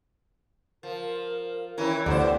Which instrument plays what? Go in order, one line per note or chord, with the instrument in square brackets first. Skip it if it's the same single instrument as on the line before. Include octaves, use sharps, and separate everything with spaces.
[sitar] F3 [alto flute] A#4
[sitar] D#3 E3 C#4 [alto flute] E4 [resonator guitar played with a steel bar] A#4
[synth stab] D2 [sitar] G2 B2 C5 [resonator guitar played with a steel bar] B3 D5 [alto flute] A4